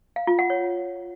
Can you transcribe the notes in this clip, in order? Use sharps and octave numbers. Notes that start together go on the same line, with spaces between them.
F5
F4
F#5
C#5